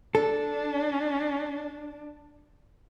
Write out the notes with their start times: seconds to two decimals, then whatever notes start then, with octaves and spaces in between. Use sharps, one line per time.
0.15 D4 A4